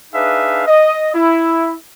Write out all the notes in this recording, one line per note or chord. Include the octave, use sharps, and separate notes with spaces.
D4 D#4 G#4 B4 E5 F5
D#5
E4